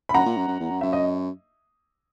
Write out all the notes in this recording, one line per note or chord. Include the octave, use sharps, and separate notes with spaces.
B5
F#2 F#5 A#5
A#2
F#2
F#2
E2
F#2
F#2 E5
D#5